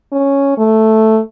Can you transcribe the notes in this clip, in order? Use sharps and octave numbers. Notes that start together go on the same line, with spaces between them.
C#4
A3